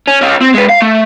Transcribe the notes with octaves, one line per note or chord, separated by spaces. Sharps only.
C#4
C#4 F4
C4
G#3 B4
F5
A3